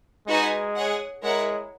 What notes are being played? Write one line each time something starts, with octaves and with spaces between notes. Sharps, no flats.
G#3 D#4 F#4 B4 D#5 G#5
G#4 C#5 F#5
G#3 E4 A#4 C#5 F#5